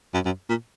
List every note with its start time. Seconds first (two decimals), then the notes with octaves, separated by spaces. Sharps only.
0.14 F#2
0.25 F#2
0.49 A#2